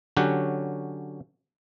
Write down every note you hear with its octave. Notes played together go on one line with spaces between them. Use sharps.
D3 F#3 C#4 G4 F#5